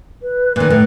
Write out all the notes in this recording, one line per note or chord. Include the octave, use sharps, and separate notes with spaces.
B4
A#2 D#3 B4
A2